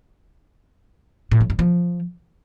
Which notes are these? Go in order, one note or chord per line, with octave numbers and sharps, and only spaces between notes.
A2
F#3
G2
F3